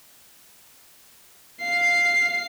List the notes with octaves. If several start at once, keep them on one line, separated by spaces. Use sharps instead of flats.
F5 C7